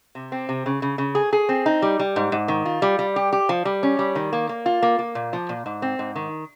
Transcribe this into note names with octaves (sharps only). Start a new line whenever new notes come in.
C3
C4
C3
C#3
C#3
C#3
G#4
G#4
C4
D#4
G3
G3
G#2
G#2
D#3
F4
G3
G3
G4
G4
F3
G3
C#4
G3
D#3
A#3
A#3
F4
A#3
A#3
A#2
F3
A#2
G#2
C4
G#2
D#3